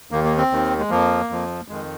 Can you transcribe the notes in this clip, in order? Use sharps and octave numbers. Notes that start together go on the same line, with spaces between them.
D#2 D#3 A#3
A#3
C4
D#2 D#3
G#3
F2 F3 A#3
F2 F3
F2 D#3 G#3